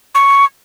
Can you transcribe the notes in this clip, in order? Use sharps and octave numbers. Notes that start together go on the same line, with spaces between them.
C#6